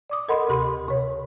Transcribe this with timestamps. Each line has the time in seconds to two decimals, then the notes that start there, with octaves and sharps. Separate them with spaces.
0.10 D5 D6 D#6
0.28 A4 A#4 D#5 F#5 B5 C6
0.48 D2 C3 G4 B5 C6
0.88 C3 C#5